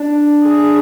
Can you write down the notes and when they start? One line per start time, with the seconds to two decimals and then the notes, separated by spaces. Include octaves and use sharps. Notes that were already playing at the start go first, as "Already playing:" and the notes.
Already playing: D4
0.44 G#4